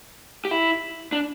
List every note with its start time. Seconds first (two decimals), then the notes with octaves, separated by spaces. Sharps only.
0.45 G4
0.51 E4
1.12 D4